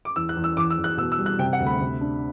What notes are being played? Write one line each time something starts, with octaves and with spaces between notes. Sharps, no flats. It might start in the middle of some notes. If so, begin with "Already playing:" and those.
D6
E2 E6
F#6
E2
E6
E2 D6
E6
E2
F#6
B2 E6
E6
G3
F#6
C3 G5
F#5
D2
B5
C3
D4